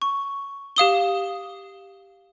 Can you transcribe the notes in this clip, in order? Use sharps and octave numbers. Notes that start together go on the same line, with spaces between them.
C#6
G4 F5 D#6 G7